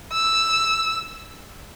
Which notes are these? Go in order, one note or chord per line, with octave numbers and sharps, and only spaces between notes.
E6